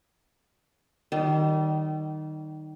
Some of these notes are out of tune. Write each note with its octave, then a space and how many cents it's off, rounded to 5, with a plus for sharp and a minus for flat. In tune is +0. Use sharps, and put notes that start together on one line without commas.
D#3 -10 G3 -35